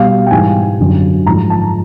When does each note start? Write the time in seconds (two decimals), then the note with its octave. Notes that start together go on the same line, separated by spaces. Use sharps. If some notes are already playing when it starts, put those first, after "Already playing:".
Already playing: B2 G3 F5
0.27 G5
0.31 G#2 E3 G3 G#5
0.79 F#2 D3 F#3
1.26 G#2 F3 G#3 A#5
1.50 A5